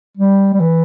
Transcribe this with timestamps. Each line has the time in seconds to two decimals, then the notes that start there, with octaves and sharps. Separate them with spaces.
0.17 G3
0.54 G3
0.60 E3